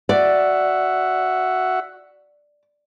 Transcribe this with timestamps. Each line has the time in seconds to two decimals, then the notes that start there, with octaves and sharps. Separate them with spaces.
0.09 F#4 D5 E5 F#5